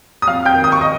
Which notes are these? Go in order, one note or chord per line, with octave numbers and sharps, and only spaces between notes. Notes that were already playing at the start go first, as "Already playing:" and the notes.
D#6
F2 F5 F6
G5 G6
D#3
D#6
C#6
D#5 D#6